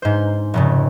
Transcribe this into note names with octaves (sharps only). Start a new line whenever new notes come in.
G#2 C5
F1 G#2 C#3